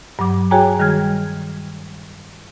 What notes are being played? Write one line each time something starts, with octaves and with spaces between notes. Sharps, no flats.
G2 F#3 D6
F#4 G#4 C#5 G5 G#5 A#5
D#3 G3 G#4 F6 G#6